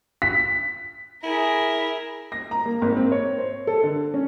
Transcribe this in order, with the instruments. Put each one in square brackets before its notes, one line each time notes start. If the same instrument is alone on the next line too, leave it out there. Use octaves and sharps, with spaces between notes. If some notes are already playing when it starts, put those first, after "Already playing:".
[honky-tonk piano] B6
[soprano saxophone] E4 [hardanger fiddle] G#4 A#4
[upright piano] A#6
A#5
A#3
G#1
C4
C#5
C5
A4
D3
C#4